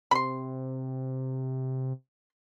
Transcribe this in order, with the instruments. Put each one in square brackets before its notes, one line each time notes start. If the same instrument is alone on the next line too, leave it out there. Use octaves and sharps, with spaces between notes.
[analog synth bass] C3 [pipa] B5 C6